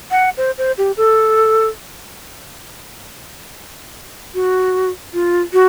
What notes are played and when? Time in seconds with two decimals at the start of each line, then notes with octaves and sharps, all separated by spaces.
0.11 F#5
0.37 C5
0.58 C5
0.78 G4
0.97 A4
4.34 F#4
5.14 F4
5.53 F#4